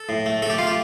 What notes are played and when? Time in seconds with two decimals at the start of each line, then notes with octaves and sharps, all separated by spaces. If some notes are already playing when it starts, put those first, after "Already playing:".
Already playing: A4
0.09 A2
0.26 A3
0.42 A3 A4
0.50 G4
0.58 A3 F4
0.67 G4